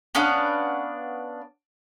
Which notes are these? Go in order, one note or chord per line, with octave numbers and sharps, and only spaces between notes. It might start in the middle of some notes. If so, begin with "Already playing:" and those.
B3 C#4 D4 F5